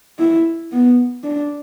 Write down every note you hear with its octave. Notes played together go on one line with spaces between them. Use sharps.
E4
B3
D4